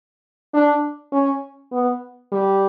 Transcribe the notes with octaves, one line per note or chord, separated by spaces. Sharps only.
D4
C#4
B3
G3